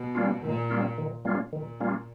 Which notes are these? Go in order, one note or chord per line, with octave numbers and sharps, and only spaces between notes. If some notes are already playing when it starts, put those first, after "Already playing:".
Already playing: B2
G3 A#3 C#4 F4
A#2 D#3
G3 A#3 C#4 F4
D#3
G3 A#3 C#4 F4
A#2 D#3
G3 A#3 C#4 F4